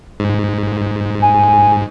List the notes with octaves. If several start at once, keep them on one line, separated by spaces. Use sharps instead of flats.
G#2
G#5